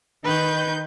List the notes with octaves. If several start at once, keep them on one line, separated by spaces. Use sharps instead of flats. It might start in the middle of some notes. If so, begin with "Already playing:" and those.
D#3 B4 G6